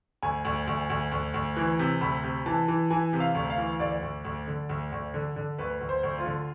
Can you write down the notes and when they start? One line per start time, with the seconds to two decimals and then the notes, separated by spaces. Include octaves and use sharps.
0.23 D2 G#5
0.45 D2
0.67 D2
0.90 D2
1.12 D2
1.34 D2
1.56 E3
1.79 C3
2.01 D2 B5
2.24 C3
2.46 E3 A5
2.68 E3
2.90 E3 G#5
3.13 C3
3.20 F5
3.35 D2
3.50 F5
3.58 E3
3.80 D2 D5
4.02 D2
4.25 D2
4.47 D3
4.69 D2
4.92 D2
5.14 D3
5.36 D3
5.58 D2 B4
5.81 D2
5.89 C5
6.03 D2
6.18 F4
6.26 D3